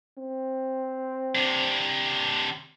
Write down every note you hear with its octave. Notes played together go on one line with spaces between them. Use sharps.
C4
C3 D4